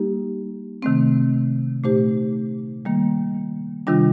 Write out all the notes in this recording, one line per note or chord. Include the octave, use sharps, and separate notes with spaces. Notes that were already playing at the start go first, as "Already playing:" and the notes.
Already playing: G3 A#3 D#4 G4
C3 D#3 A3 C4
A#2 A3 D#4 G4 C5
D#3 G3 A#3
C3 D#3 G3 D4 F4